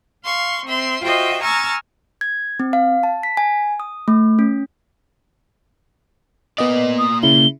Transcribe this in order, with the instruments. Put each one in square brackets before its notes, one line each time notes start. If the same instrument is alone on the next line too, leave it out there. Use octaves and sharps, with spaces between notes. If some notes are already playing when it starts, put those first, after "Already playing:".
[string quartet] F5 C6 C#6
C4 E5 C6
F4 F#4 C5 D#5 E5 G5
G#5 A#5 C#6 E6 F6 A6
[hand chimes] G#6
C4
F5
A5
B6
G#5
D#6
A3
C#4
[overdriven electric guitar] A#3 D5 [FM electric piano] B3 D#5
[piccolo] D#6
[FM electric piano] C#3 E4 [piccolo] G7